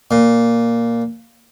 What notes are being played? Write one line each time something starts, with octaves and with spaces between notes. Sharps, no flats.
A#2